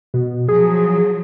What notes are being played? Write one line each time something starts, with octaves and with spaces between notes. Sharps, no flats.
B2
F3 F#3 G#4